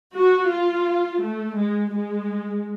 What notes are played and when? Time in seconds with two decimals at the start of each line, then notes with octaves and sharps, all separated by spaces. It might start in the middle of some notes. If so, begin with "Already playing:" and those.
0.15 F#4
0.50 F4
1.22 A3
1.57 G#3
1.93 G#3